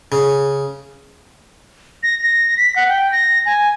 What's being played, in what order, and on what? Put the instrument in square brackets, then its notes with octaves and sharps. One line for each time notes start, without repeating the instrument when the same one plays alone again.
[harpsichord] C#3
[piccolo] A#6
A#6
B6
F#5
G5
A#6
G#5